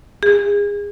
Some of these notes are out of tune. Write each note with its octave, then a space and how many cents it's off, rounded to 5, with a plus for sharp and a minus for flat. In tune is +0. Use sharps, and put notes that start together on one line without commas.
G#4 -30